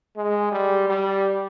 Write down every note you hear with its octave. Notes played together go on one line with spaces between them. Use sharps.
G#3
G3
G3